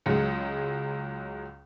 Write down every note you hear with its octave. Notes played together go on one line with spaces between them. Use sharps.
C#2 F#3 G#3 C#7